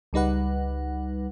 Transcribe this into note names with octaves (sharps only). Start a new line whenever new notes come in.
C#2 G3 D#4 B4 F#5